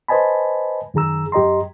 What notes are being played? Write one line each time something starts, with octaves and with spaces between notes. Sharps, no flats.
B4 C5 D#5 G#5 A5 B5
F#2 D#3 G#4 A#5 E6
F#2 G4 D#5 A#5 C6